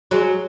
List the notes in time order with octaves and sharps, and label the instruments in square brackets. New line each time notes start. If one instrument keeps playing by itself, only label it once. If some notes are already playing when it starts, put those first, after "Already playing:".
[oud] F#3 G#3